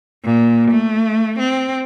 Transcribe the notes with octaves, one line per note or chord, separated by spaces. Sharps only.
A#2
A3
C4